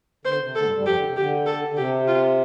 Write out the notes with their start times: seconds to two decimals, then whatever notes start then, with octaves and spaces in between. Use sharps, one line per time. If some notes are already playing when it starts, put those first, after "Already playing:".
0.25 D3 C5
0.40 C3
0.55 D3 A4
0.61 A3
0.65 G2 G3
0.75 G2 G3
0.85 F2 F3 G4
0.96 D3
1.06 C3
1.16 D3 G4
1.46 A4
1.68 D3
1.76 C3 G4
2.07 F4